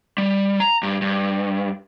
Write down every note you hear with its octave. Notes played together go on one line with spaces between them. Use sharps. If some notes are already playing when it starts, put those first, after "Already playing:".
G3
A#5
G2
G2